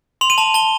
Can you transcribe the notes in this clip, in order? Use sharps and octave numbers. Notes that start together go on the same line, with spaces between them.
C6 F7
D#7
A5 F7
A5 G7